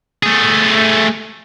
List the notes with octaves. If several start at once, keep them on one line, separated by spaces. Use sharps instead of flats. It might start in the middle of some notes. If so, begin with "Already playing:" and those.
A3 G#4